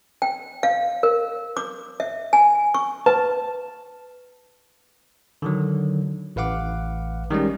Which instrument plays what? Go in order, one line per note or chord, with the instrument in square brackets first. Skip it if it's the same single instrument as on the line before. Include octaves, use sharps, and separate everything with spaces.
[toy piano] G5
F5
A#4
D6
E5
G#5
C#6
[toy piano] B4 [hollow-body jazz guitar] A5
[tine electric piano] D3 D#3 F#3
A1 B4 F5 F#5 D6
D#3 G3 G#3 C#4